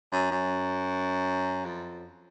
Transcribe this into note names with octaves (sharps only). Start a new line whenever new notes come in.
F#2
F#2
F2